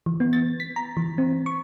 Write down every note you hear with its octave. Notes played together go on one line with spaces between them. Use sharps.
E3
B3
A6
B6
A#5
E3
C4
C#6